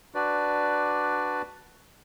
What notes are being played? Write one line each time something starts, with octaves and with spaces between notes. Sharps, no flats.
D4 F#4 B4 D5